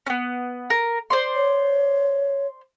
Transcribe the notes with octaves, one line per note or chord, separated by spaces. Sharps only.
B3 C#4
A#4
C5 D5 C6
C#5